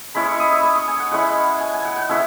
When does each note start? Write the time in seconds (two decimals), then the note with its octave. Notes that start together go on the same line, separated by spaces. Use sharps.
0.15 G#3 C#4 E4 B5
0.28 C#6
0.40 D#6
0.52 E6
0.63 D#6
0.75 C#6
0.88 G#5
1.00 F#5
1.11 G#3 C#4 E4 F#5
1.60 G#5
1.73 G#5
1.85 F#5
1.96 F#5
2.09 G#3 C#4 E4 E5